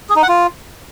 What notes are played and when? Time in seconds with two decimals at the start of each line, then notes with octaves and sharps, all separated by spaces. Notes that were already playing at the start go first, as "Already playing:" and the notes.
0.10 G#4
0.16 D#4
0.22 F#5
0.29 F4